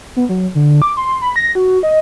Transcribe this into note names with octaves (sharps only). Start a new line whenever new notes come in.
B3
F#3
D3
D6
C6
B5
A#6
F#4
D#5